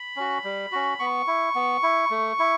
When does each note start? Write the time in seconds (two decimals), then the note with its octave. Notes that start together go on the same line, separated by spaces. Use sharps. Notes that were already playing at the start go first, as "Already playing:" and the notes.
Already playing: B5
0.16 C#4 F#4
0.44 G3
0.72 C#4 F#4
0.99 B3 C#6
1.27 E4
1.55 B3
1.83 E4
2.11 A3
2.39 E4